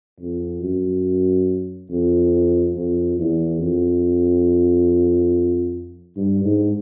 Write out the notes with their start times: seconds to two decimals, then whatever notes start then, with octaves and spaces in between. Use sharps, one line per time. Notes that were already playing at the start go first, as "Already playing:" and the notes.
0.20 F2
0.62 F#2
1.90 F2
2.75 F2
3.19 E2
3.60 F2
6.17 G2
6.45 G#2